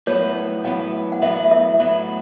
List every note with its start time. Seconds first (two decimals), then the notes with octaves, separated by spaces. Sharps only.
0.07 A2 F#3 B3 E4 B4 C#5
0.64 A2 F#3 B3 E4 B4 F#5
1.12 F#5
1.22 A2 F#3 B3 E4 B4 E5
1.51 E5
1.80 A2 F#3 B3 E4 B4